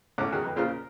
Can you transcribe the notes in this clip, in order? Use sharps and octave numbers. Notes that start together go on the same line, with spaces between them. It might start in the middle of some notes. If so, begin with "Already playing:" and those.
G#1 A2 C#4 F#5 D6
D#3 G#3 F#4 F#5 G#5
F2 B4
A#2 C#3 F4 C5 F6
A#4